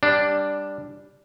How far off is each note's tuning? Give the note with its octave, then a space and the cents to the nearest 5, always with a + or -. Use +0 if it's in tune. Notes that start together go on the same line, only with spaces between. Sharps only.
G3 +10 D4 +0